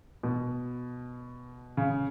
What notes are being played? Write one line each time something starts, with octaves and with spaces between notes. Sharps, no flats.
B2
C#3